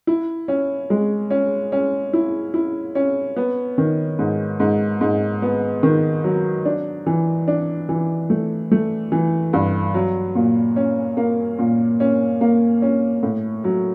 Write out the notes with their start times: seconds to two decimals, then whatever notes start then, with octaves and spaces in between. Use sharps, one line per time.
0.07 E4
0.48 C#4
0.90 G#3
1.30 C#4
1.72 C#4
2.13 E4
2.54 E4
2.95 C#4
3.36 B3
3.78 D#3
4.19 G#2
4.60 G#2
5.01 G#2
5.42 B3
5.83 D#3
6.24 F#3
6.65 D4
7.06 E3
7.48 D4
7.89 E3
8.30 A3
8.72 A3
9.12 E3
9.53 G2
9.94 F#3
10.35 A#2
10.76 C#4
11.17 A#3
11.59 A#2
12.00 C#4
12.41 A#3
12.82 C#4
13.23 A2
13.64 F#3